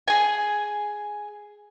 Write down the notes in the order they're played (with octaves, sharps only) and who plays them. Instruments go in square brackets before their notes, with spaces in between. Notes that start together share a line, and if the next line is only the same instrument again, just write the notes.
[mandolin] G#4 G#5